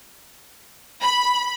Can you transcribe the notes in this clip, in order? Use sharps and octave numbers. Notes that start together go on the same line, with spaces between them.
B5